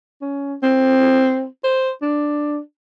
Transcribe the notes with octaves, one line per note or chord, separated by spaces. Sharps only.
C#4
C4
C5
D4